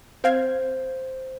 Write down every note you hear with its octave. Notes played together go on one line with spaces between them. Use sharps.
C4 C5 F5 G#6